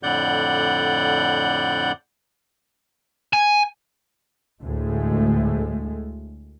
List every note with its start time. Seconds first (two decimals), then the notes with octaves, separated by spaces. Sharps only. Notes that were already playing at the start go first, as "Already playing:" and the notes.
0.03 F2 A2 D3 D5 F#5 G6
3.33 G#5
4.63 D2 A2 G#3 A3